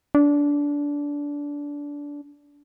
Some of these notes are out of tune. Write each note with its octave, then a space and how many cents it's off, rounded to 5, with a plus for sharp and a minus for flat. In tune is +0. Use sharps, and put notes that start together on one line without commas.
D4 -20